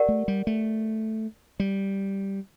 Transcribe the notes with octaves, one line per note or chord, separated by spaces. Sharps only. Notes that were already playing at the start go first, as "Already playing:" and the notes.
Already playing: G4 A#4 D5 F#5
A3
G3
A3
G3